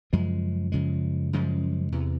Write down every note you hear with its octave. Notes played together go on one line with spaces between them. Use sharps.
F#2 C#3 F3 G#3
F#2 C#3 F3 G#3
F#2 C#3 F3 G#3
E2 C3 E3